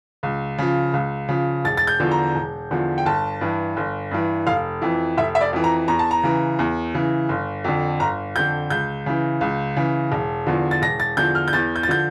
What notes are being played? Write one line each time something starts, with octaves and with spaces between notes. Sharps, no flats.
C#2
C#3 F3
C#2
C#3 F3
E1 A6
A6
G6
E2 D3 F3
A#5
E1
E2 D3 F3
G5
G1 A5
G2 E3
G1
G2 E3
F1 F5
F2 E3
F1 E5
E5
D5
F2 E3
A#5
E2 A#5
A5
A#5
C#3 E3
E2
C#3 E3
G1
F2 D3
G1 A#5
F2 D3 G6
C#2 G6
C#3 E3
C#2
C#3 E3
E1
E2 D3 F3
A6
E1 A#6
A6
E2 D3 F3 G6
F6
G6
E2 A6
G6
A6
D3 F3 G6